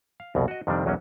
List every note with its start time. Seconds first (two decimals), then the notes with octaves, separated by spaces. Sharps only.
0.20 F5
0.35 C2 F2 B2
0.48 F#4 D#5
0.67 F2 C3 D#3 G3 C4 D4
0.85 B1 E2 F#3 A#3 C#4